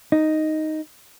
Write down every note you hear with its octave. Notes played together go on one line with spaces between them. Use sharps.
D#4